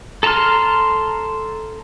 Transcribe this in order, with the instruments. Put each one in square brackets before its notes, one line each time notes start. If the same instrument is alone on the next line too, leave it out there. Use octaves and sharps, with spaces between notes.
[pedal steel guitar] A4 A5 A#5 C6 F6